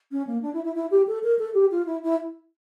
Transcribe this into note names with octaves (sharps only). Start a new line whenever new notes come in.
C#4
A#3
D4
E4
E4
E4
G4
A4
A#4
A4
G4
F4
E4
E4